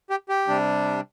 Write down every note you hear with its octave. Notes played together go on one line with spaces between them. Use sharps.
G4
G4
C3 G3 D4